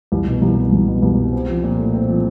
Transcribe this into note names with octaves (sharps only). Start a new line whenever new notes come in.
C2
B2
C2
G3
C2
B2
C2
G3
C4
F3
A#2
A3
C4
F3